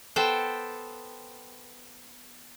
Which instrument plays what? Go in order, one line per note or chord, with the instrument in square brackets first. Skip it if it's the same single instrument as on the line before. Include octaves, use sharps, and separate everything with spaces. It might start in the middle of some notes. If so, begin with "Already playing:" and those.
[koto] B3 A4 C5 G5